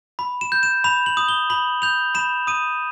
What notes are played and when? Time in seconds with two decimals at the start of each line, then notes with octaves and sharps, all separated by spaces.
0.19 B5
0.41 E7
0.52 G6
0.63 E7
0.84 B5 F7
1.06 F#7
1.17 D#6
1.28 G7
1.50 B5 F#7
1.82 G6 F7
2.15 B5 E7
2.47 D#6 D#7